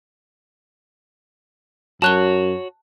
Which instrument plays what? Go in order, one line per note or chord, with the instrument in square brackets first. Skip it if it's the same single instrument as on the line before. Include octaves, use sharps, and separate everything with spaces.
[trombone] F#2 [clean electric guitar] F#4 C#5 [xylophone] A5 F#6 G7